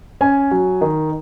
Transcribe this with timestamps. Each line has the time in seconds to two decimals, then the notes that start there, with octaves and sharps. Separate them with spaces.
0.21 C#4 G#5
0.51 F#3
0.81 D#3